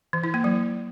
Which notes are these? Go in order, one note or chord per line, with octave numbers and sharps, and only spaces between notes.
E3
E4
A#3
F#3